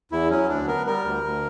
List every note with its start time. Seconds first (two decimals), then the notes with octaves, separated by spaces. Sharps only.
0.12 E2 E4
0.30 F#3 C#4
0.49 D2 D4
0.68 B3 A#4
0.87 G3 A#4
1.05 D2
1.23 D2